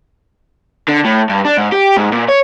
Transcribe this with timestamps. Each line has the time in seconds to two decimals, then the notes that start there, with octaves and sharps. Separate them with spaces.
0.89 D3
1.05 A2
1.29 G2
1.45 D4
1.58 G#2
1.72 G4
1.97 G#2
2.12 A#2
2.29 C#5